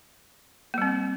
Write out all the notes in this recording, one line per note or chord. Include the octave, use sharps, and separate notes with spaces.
G3 A#3 C4